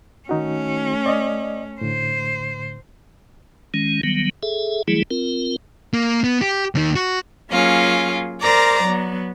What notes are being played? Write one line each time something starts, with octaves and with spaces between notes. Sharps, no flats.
D#3 A3 C#4 D#4 F#4
D5 D#5
A2 D3 C5
D#3 G#3 C#4
D#3 F#3 G3 B3
G#4 A4 E5
E3 F#3 G3 A3 E4 G#4
C4 F4 A#4
A#3
B3
G4
D#2 D#3
F#4
F#3 A#3 C#4 F4 G#4
A#4 C5 D5 A#5 D6
F#3 B3